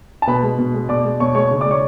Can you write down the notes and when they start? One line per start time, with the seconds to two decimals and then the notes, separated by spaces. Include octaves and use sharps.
0.22 A5
0.27 B2 B4 B5
0.43 G#3
0.58 B2
0.74 G#3
0.89 B2 D5 D6
1.05 G#3
1.20 B2 C#5 C#6
1.35 G#3 C#5 C#6
1.51 C#3
1.61 D5 D6
1.66 G#3
1.71 C#5 C#6